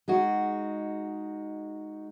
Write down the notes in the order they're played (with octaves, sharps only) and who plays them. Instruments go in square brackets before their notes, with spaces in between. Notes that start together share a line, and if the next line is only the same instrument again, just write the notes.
[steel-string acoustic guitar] G#3 D#4 F#4